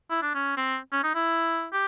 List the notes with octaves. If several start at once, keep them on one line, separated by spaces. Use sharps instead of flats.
E4
D4
C#4
C4
C#4
D#4
E4
G4